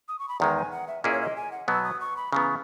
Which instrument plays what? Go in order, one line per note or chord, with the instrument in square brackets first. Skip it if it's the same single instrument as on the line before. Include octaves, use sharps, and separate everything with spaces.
[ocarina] D#6
C#6
B5
[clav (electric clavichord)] E2 D#3 G#3 [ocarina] A#5
[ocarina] G#5
F#5
E5
[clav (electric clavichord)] A#2 A#3 C#4 E4 G#4 [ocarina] D#5
[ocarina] C#5
D#5
G#5
F#5
[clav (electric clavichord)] B2 F#3 B3 [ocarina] E6
[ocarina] D#6
C#6
B5
[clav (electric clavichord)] C#3 E3 B3 [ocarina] A#5